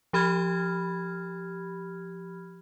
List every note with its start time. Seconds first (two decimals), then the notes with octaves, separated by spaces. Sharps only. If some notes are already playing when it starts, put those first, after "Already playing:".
0.13 F3 G4 B5 F6 G#6